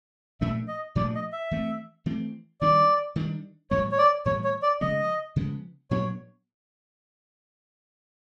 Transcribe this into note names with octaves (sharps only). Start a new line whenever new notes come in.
A#2 F3 A3 D4 E5
D#5
A#2 F3 A3 D4 D5
D#5
E5
E3 A3 C4
E3 A3 C4
D#3 G3 B3 D4 D5
D#3 G3 B3 D4
A2 E3 G3 B3 C#5
C#5
D5
A2 E3 G3 B3 C#5
C#5
D5
C#3 F3 G#3 B3 D#5
C#3 F3 G#3 B3
A#2 F#3 B3 D4 C#5